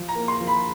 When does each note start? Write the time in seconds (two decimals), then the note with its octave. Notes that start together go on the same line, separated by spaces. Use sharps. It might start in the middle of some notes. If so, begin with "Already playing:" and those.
Already playing: F3
0.09 A#5
0.15 A#3
0.28 C6
0.41 F3
0.47 B5